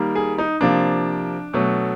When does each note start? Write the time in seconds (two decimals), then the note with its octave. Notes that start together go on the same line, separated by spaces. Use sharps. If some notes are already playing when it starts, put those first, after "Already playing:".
Already playing: D#3 G3 A#3
0.16 G#4
0.38 D#4
0.61 C3 F3 A#3 D4
1.53 B2 F#3 A3